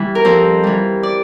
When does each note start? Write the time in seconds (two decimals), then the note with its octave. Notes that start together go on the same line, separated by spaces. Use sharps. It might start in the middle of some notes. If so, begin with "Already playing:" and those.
Already playing: E3 G3
0.15 A#4
0.25 F2 C5
0.64 E3 G3
1.03 D5